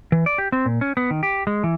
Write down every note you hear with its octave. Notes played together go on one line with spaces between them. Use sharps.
E3
D5
G4
C4
A#2
C#4
B3
D#3
G4
G#3
E3